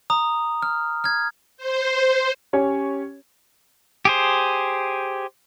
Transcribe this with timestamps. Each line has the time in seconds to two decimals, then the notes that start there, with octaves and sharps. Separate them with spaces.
0.10 A#5 D#6
0.62 F6
1.04 F6 G#6
1.57 C5
2.53 C#4 G4 C#5
4.05 G4 G#4 C5